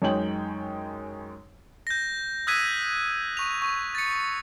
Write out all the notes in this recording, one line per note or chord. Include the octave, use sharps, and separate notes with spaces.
F#2 G#3 D#4 C#5 G5 F#7
G6 A#6
D#6 E6 F#6 G#6 B6 D#7
C#6 F7
C#6
A6 C#7